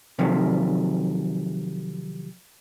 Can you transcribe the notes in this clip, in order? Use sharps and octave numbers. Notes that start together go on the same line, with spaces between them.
C3 D#3 F3 F#3 A3